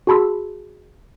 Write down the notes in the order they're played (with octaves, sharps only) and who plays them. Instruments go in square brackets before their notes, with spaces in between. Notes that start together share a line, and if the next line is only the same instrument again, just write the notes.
[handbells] F#4 G#4 A5 B5 C6 E6